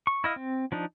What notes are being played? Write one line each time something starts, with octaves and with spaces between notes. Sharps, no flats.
C#6
E4 D#5 F5
C4
F3 D4 D#4